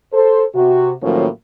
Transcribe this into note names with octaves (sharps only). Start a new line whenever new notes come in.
A4 C5
C3 F#4
A2 D#3 F3 F#3 A#3 C#4